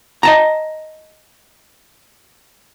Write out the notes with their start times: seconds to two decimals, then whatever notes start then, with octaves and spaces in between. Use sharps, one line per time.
0.23 D#5 A5 A#5